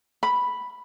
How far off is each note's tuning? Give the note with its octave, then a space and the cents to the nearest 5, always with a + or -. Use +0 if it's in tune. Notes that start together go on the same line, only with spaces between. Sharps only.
B5 +0